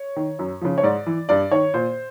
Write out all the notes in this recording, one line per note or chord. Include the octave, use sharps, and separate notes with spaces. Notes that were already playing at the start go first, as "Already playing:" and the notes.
Already playing: C#5
D#3
F#2
C#3 F3
C#5
G#2 D5
E3
G2 D5
D#3 C#5
A#2 C5